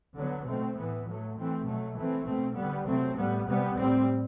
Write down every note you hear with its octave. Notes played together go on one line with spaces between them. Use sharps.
D3 F#3 B3
B2 A3 C4
A2 E3 B3
A2 F#3 A3
E3 A3 C4
B2 F#3 A3
E3 A3 C4
B2 A3 C4
D3 G3 B3
C3 F#3 A3 C4
A2 G3 B3
C3 G3 B3
A2 G3 C4